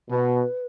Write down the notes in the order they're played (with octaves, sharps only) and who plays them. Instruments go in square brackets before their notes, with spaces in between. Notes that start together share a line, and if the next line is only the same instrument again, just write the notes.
[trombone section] B2 [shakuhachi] B4